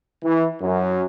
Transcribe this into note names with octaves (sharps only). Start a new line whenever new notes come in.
E3
F#2